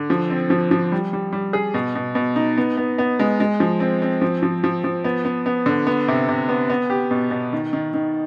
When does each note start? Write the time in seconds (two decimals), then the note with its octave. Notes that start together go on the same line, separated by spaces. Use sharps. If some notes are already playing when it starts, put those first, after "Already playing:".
Already playing: D3
0.10 F3
0.30 C4
0.50 F3
0.71 F3
0.92 G3
1.13 G3
1.33 G3
1.53 G#4
1.74 B2
1.95 B2
2.15 B2
2.36 D#4
2.58 B3
2.77 B3
2.98 B3
3.19 G#3
3.40 G#3
3.60 F3
3.80 C4
4.02 C4
4.21 F3
4.43 F3
4.64 F3
4.84 F3
5.04 B3
5.25 B3
5.46 B3
5.66 D3
5.87 B3
6.08 C3
6.29 C3
6.48 B3
6.70 B3
6.90 G4
7.11 B2
7.31 B2
7.53 D#3
7.73 D#3
7.94 D#3